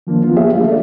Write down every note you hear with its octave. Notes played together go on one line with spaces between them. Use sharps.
D#3 F3 A#3 D4
B3 F4
G4 G#4 C#5 E5 F5
F#3 A3 A#3 D4
A4 D5